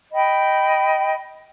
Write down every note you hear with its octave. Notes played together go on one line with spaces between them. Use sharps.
D#5 G5 B5